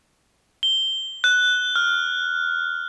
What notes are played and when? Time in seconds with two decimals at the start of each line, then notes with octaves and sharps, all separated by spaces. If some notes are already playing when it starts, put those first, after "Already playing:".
0.63 G7
1.24 F#6
1.76 F6